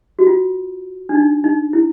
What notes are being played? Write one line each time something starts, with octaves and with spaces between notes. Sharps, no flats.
F#4
F4
D4
D#4
D#4
E4